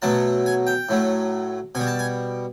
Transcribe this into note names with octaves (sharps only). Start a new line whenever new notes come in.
B2 F#3 A3 A5
G#5
G5
A2 F#3 A3
B2 G3 G#5
A5
G#5